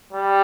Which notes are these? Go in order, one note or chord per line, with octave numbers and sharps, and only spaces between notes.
G3